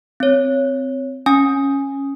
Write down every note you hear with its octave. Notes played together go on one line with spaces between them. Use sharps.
C4 C#5
C#4 G#5 D#6